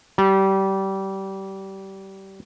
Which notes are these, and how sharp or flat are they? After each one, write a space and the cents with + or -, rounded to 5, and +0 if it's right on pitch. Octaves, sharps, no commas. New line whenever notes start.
G3 -25